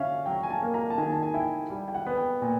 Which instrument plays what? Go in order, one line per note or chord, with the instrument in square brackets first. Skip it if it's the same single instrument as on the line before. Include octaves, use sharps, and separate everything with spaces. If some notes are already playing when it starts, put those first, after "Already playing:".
Already playing: [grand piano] D3 C#4 [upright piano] E5 F5
[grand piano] F#3 [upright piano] G5
[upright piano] G#5
A5
[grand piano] A#3
[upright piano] A#5
A5
[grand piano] D#3 [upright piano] G#5
[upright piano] A5
G#5
[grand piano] E4 [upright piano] G5
[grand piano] G3
[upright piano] G5
F#5
[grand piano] B3
[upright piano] G5
[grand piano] A#2